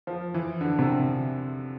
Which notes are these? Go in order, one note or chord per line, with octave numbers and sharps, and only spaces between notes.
F3
E3
D3
C3